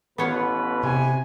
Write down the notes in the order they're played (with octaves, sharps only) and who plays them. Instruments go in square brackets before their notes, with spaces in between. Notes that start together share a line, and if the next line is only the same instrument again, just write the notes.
[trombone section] A1 B2 B4 [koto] B3 C#5 F5
[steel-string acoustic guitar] C3 [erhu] G#5